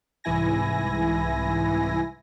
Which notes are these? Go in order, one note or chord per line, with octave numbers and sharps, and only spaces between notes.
C2 G#2 E3 E4 G#5 A#6